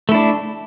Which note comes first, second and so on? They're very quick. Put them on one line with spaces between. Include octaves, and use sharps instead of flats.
A3 E4 D4